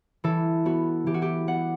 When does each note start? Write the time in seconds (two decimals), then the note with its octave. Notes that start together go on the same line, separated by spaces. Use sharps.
0.24 E3 A4
0.65 B3 F#4
1.06 E3 G4
1.14 F#4
1.22 G4
1.47 B3 F#5